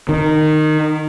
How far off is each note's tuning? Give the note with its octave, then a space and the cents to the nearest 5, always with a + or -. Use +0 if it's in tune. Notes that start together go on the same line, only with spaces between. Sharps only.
D#3 -15